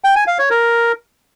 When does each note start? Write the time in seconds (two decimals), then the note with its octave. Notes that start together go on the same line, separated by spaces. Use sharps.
0.04 G5
0.16 G#5
0.27 F5
0.39 C#5
0.50 A#4